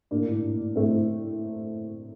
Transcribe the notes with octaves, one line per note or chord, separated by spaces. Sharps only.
A2 A#3 D4
A2
A2
A2
A2 A3 C4
A2